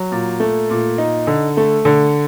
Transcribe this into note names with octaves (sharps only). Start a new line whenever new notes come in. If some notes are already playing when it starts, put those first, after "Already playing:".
Already playing: F#3
A#2
A3
A#2
D#4
D3
A3
D3